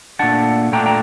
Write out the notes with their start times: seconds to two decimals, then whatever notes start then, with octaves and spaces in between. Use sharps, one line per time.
0.19 A#2 A3 D4 F#5 A5
0.72 A#2 A3 D4 G5 A#5
0.86 G5 A#5